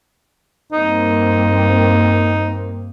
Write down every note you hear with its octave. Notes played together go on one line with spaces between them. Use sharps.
G2 A#3 C4 D#4